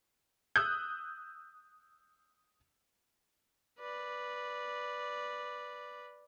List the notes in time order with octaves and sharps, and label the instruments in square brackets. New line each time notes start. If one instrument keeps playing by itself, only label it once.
[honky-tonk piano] D#6 E6 F#6 G6
[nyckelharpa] B4 D5